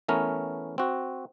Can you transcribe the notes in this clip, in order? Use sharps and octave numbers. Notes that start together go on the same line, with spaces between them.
E3 A3 B3 C#4 A#4
C4 F#4